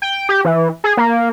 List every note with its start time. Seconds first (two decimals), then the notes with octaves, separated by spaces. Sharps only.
0.02 G5
0.29 G4
0.44 E3
0.84 G#4
0.97 A#3